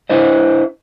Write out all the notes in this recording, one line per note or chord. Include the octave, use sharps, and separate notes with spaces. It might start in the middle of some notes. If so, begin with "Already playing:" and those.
D4 E4 C5 D#5